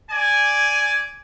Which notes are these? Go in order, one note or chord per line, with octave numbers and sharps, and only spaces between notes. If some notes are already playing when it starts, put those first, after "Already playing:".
D5 G#5